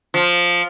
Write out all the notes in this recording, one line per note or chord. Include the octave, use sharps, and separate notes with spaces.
F3